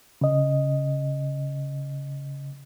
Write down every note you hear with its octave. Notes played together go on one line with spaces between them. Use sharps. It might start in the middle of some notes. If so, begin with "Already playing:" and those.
C#3 D#5